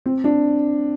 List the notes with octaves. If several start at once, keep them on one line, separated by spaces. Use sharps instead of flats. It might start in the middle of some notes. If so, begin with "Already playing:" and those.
C4
D4